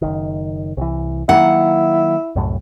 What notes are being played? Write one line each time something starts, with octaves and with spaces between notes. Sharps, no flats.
F#1 B1 D#3
C2 E3
D#3 F#3 A#3 E4 F#5
C2 F#2 A2